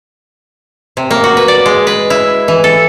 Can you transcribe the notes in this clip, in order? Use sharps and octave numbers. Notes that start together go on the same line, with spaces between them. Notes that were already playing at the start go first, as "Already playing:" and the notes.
C3
A#3
F#4
B4
D5
G#3
B4
E4
E3
A4